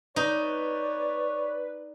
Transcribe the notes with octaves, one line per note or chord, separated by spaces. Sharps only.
D#4 B4 C#5 D5